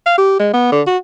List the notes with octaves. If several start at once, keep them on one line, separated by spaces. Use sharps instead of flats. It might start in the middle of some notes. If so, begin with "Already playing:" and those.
F5
G4
G#3
B3
D3
F#4